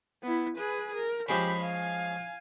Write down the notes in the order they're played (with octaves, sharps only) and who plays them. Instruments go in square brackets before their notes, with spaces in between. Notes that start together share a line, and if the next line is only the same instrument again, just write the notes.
[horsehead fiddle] B3 E4
G#4 B4
A#4
[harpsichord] F3 G#3 C#4 [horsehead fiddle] G4 B5
[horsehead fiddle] F5 G#5